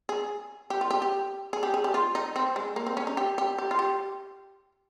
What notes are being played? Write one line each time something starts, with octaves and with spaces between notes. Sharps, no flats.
G#4
G4
F4
G4
G4
G#4
G4
G#4
G4
F4
D#4
C4
G#3
A#3
C4
C#4
D#4
G4
G4
G4
F4
G4